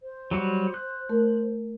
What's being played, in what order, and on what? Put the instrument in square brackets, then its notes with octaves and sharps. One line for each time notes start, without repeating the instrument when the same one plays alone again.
[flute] C5
[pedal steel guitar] F#3 G3 F#4 [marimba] A#5
[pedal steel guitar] F#6
[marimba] A3 A#4